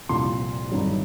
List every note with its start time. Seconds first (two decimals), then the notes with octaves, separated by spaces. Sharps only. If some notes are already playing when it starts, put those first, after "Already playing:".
0.09 C2 A#2 F3 C6
0.71 G1 G2 D#3 F#3